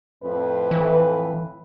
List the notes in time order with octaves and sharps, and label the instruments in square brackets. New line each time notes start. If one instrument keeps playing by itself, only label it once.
[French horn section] F2 A2 B4
[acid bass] E3